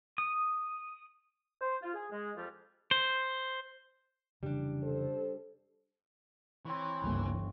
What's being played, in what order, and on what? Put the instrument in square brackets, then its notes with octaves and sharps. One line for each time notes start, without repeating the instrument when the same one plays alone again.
[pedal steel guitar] D#6
[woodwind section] C5
F4
G#4
G#3
F2 F3 G3 F4
[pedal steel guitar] C5
[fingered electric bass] F1 C#3 E3 [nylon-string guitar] G3 D4
[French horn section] A4 C5
[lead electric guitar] E3 [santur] C4 C#5 C#6
[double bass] G1 [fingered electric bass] C#2 G3 A#3